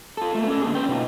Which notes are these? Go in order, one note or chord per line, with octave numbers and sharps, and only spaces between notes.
F4 A4
A3 A#3
C#4 A4
D3 A#3 G#4
C#4 B4 G5
B2 D#4 F4